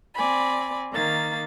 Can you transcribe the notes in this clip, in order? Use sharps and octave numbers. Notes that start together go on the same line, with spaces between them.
C4 D5 G#5 B5
D#3 A#3 A6